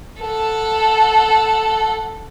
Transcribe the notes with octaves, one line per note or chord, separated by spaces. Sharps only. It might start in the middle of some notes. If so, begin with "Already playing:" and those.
A4 F#5